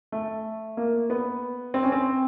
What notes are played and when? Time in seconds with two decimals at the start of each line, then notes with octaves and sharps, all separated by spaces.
0.12 A3
0.77 A#3
1.10 B3
1.74 C4
1.83 C#4
1.92 C4